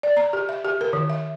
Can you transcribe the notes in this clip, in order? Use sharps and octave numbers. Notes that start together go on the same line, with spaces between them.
D5
A#5
G4
E5
G4
A#4
D#3
E5